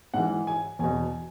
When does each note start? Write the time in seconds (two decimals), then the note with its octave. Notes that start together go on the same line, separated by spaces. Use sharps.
0.14 G#2 E3 F#5
0.47 G#5
0.79 E2 B2 G#5